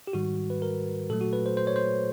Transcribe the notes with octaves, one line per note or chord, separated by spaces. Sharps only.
G4
G#2 D#3 G3 F#4
B4
A#4
A#2 F#3 A3 A4
F#4
B4
C5
C5
C#5
C5